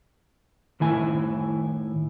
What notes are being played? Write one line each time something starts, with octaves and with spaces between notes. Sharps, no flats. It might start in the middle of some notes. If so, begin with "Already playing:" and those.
A2 D#3 E4 G#5